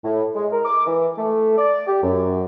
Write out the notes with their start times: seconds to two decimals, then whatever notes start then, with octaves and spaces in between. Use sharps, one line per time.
0.04 A2
0.35 G#3
0.52 A#4
0.65 D6
0.86 E3
1.17 A3
1.57 D5
1.87 G4
2.01 F#2